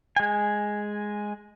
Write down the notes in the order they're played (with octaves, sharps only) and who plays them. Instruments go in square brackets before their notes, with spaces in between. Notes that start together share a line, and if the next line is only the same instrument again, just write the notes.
[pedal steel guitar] G#3 G#5